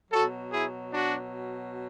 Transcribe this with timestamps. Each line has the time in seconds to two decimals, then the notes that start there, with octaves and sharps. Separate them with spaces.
0.12 B2 F#3 F#4 A4
0.52 E4 G#4
0.93 D4 F#4